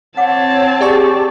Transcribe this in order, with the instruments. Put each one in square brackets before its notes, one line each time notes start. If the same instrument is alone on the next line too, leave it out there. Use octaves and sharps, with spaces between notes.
[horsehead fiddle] C4 A5 [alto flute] C#5 [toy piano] F#5 D6
[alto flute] G4 [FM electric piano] G#4 D5 C#6